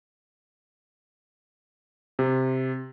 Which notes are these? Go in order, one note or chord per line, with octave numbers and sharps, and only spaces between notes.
C3